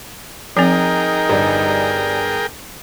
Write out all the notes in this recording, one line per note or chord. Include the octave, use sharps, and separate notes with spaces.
F3 C4 D#4 G#4 A#4 G5
G1 G3 D4